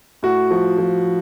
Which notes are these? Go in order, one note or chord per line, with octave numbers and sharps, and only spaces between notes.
A2 F#4
F3
F3